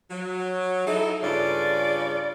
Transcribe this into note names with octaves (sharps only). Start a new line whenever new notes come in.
F#3
D#4 E4 A4
G2 C#3 F4 D5